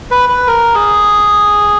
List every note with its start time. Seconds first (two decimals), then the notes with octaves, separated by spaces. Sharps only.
0.11 B4
0.29 B4
0.47 A#4
0.75 G#4